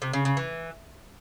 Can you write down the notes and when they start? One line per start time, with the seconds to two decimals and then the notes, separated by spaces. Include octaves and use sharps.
0.02 C3
0.13 C#3
0.25 C#3
0.37 E3